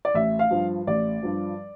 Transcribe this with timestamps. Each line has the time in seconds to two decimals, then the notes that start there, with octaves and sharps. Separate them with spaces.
0.05 D5
0.14 A1 E5
0.39 F5
0.51 G2 F3
0.87 A1 D5
1.23 G2 F3